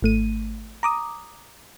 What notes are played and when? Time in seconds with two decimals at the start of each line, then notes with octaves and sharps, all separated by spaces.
0.02 G#1 A3 D#7
0.83 A#5 D6 D#6